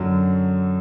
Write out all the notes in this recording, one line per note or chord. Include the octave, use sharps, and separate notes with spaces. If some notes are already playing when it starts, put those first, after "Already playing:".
Already playing: F#2 D3 F#3